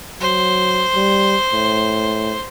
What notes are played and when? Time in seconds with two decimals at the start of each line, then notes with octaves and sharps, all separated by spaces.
0.20 F#3 C5
0.95 G3
1.52 A2